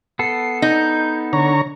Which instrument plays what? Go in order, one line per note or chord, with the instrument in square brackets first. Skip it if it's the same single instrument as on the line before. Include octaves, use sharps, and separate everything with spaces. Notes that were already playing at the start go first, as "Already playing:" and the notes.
[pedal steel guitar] B3 A4 [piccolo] C7
[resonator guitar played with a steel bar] D#4 [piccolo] G6
[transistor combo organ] D3 C#5 A#5 [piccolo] C#6